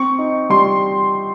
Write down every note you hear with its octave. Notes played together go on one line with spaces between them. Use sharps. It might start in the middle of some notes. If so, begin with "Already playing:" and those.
Already playing: C4 C#6
D#4
G3 C6